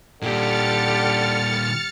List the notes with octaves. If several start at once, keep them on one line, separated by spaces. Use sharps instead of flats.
A#2 D3 G3 G4 F6 A6 C#7